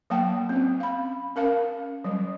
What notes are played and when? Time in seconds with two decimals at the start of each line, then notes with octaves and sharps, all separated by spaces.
0.10 F#3 A#3 F#5 G5 A5
0.49 C4 C#4
0.80 F5 B5
1.36 C#4 A#4 F5 A5
2.04 F#3 G3 C#4